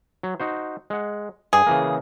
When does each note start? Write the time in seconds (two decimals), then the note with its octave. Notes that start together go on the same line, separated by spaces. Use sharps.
0.23 F#3
0.40 D#4 F#4 C5
0.90 G#3 F#5
1.53 G2 G#4
1.67 C#3 E3 A#3